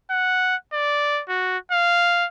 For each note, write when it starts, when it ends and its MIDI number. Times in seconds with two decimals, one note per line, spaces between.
0.10 0.56 78
0.73 1.22 74
1.29 1.58 66
1.71 2.26 77